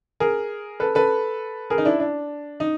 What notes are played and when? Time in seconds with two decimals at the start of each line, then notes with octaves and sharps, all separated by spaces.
0.20 G#4 A#4
0.80 A4 B4
0.95 A4 B4
1.70 G#4 A#4
1.78 D#4
1.85 D4 E4
2.00 D4
2.60 D#4